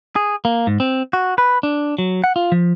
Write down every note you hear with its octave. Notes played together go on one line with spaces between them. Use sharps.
G#4
A#3
G#2
C4
F#4
B4
D4
F#3
F#5
F4
F3